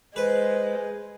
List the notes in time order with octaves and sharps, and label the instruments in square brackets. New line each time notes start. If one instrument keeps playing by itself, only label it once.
[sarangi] G#3 [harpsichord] B4 [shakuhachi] C5